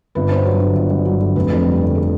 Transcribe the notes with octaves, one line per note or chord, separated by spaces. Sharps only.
G1 B4
G2 C5
F#3 C#5
D3
G1
G2
F#3
D3
F1 B4
F2
G3
D3
A4